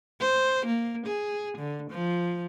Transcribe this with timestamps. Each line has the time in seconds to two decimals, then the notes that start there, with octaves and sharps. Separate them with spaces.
0.21 C5
0.66 A#3
1.06 G#4
1.58 D3
1.91 F3